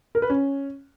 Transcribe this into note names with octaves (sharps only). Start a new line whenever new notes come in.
A#4
B4
C#4